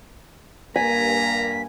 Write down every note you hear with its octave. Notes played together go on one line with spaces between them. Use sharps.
G2 A#3 G#5 A#5 B6